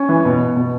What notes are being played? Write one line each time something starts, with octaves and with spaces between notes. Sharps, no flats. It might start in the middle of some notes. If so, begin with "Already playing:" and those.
Already playing: C#4
E3
B2
B2